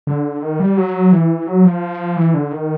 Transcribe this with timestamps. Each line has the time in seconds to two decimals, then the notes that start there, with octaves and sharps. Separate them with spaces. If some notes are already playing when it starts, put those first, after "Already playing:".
0.07 D3
0.42 D#3
0.60 G3
0.77 F#3
1.12 E3
1.47 F#3
1.65 F3
2.16 E3
2.34 D3
2.52 D#3